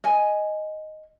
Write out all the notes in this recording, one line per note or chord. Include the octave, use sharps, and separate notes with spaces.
D#5 G#5